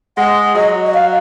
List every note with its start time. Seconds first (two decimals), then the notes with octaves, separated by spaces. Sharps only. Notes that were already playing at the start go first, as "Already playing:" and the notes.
0.18 G#3 F#5
0.55 F#3 D#5
0.86 D#5
0.94 F5